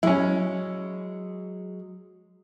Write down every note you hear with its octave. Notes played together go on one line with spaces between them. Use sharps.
F#3 G#3 C#4 E4